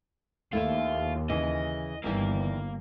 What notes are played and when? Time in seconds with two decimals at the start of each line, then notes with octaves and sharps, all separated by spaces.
0.53 D#2 A3 E4 F4 E5
1.30 C#3 E3 D#5
2.04 G1 D#2 E3 G3 A#3